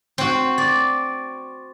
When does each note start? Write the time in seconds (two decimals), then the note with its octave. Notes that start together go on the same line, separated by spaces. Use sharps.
0.18 C4 F#4
0.58 D5